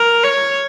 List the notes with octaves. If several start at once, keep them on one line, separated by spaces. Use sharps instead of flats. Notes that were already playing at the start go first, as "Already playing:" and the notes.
Already playing: A#4
C#5